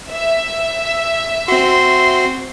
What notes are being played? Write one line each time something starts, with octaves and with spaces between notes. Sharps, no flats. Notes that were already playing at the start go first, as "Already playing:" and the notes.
E5
C4 F#4 C6